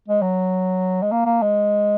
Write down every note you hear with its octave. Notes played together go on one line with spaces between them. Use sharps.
G#3
F#3
G#3
A#3
A#3
G#3